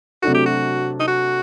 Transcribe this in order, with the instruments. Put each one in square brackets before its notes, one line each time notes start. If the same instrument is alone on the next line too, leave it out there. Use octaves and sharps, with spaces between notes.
[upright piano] C3 F#3 A3 D4 A4 [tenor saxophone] F#4
[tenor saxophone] G4
F#4
D#4
F#4